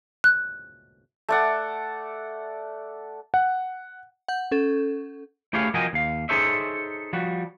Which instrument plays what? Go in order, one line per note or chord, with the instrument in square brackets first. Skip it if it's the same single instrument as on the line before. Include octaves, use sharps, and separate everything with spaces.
[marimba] F#6
[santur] A3 D5 F#5
[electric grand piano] F#5
[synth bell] F#5 G6
C#4 A4
[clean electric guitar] A3 E4 G4 G#4 C#5 F5
F3 F#4 A#4 D#5 G5 G#5
D#2 F5
D#4 G#4 A4 C5 C#5 E5
F3 G3 F#4